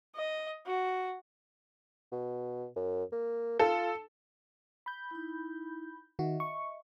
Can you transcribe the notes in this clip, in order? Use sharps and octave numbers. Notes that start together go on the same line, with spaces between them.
D#5
F#4
B2
F#2
A#3
F4 A4
B5 G6
D#4 E4
D#3 F#4 D#5 E5
C#6